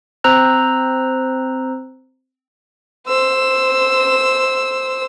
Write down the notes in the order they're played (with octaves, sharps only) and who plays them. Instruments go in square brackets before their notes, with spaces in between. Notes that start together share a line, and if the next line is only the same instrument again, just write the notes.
[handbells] C4 C5 A#5 E6 F#6
[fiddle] C5 E6